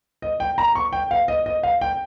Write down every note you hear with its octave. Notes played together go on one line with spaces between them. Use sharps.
D#5
G5
A#5
C#6
G5
F5
D#5
D#5
F5
G5